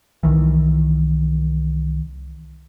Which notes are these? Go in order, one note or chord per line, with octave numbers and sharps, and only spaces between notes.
C2 D#3 E3